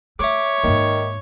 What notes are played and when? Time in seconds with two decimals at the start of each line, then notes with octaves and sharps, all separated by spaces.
0.19 A3 C#5 E5 D6
0.64 G#2 D#3 A#3